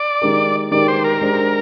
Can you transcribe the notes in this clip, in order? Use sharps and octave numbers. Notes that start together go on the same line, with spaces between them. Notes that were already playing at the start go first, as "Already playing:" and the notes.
Already playing: D5
D#3 G#3 D#4 G4 A#4
D#3 G#3 D#4 G4 A#4 D5
C5
A#4
G#3 D4 G4 C5